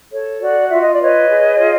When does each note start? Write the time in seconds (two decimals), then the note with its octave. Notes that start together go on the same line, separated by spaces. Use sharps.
0.11 A4 C#5
0.41 F#4 D5
0.70 F4 E5
0.80 D#5
0.91 D5
1.00 B4 C#5 D#5
1.29 G#4
1.59 F4